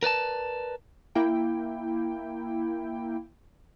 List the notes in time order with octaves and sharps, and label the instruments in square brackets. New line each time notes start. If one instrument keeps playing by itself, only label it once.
[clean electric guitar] A#4 B4 D5 A5
[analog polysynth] A#3 E4 G5